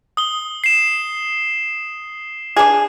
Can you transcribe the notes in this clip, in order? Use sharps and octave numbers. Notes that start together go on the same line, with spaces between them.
D#6 G7
C7 E7
D4 G#4